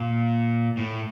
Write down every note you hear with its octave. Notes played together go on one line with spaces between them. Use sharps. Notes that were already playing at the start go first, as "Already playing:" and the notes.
Already playing: A#2
A2